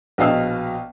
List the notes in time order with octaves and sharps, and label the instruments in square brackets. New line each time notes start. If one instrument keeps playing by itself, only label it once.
[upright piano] A#1 B2 D#5 F5 A5 E6